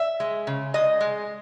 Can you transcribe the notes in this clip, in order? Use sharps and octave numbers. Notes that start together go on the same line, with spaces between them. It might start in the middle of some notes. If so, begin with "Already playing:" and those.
Already playing: E5
G#3
C#3
G#3 D#5
G#3